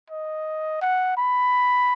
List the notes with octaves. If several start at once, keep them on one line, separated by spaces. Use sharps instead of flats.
D#5
F#5
B5